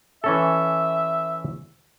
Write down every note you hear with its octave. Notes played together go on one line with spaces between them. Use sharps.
E3 C#4 A4 E5